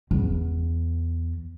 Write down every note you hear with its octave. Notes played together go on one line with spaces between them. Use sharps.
E2